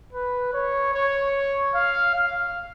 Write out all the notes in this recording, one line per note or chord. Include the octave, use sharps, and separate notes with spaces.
B4
C#5
C#5
F5
F5